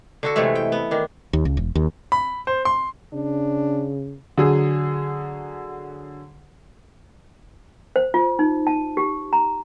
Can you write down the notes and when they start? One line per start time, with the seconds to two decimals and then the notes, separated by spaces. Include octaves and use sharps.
0.23 D3 F#4 A4
0.36 C3 E3 G#3 A3
0.55 G5
0.72 B3
0.91 D#3 D4
1.33 D#2
1.45 C#2
1.57 E1
1.75 D#2
2.12 B5
2.47 C5
2.65 C6
3.14 C#3 D4
4.38 D3 F#3 G#4
7.96 C5
8.14 F4
8.39 D#4
8.67 A5
8.97 G4
9.33 A#5